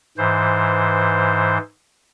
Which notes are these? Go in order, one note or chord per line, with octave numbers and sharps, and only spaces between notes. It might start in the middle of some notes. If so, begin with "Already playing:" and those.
G#2 E3 C5